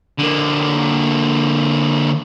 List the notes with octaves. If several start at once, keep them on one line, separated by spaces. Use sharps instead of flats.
D3 A#3